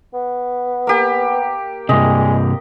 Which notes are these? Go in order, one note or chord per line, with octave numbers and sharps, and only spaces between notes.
B3
A#3 G4
G2 C3 G#3 D#5